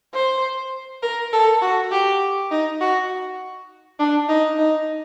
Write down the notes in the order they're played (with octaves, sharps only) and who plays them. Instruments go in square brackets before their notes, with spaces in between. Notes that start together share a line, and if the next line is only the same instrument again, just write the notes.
[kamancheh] C5
A#4
A4
F#4
G4
D#4
F#4
D4
D#4
D#4